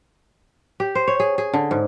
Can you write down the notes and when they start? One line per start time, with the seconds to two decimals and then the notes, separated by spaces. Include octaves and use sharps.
0.80 G4
0.95 C5
1.08 C#5
1.20 G#4
1.38 G#4
1.54 D3
1.71 G#2